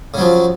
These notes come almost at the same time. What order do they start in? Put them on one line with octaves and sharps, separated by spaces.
C#3 F#3 F3